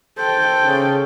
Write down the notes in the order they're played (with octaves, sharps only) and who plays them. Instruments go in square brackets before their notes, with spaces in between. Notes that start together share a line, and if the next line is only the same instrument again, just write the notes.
[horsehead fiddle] A4 G5 [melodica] C5
[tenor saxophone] C#3